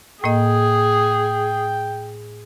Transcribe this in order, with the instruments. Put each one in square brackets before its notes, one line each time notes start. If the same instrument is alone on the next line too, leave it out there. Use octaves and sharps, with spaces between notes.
[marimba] A2 A#3 D#5 [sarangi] G#4 [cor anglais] G5